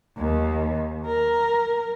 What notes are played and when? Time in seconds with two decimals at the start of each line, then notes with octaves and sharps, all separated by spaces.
0.18 D#2
1.07 A#4